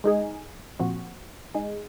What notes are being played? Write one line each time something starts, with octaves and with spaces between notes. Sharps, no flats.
G#3 D#4 G#4
A#2 F3 C4 F#4
G#3 D#4 G#4